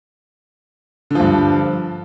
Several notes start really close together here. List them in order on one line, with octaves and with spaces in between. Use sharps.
D3 F3 G2